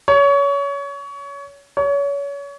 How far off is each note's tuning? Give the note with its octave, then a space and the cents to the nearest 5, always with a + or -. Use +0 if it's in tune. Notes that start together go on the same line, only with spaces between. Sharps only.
C#5 +25
C#5 +30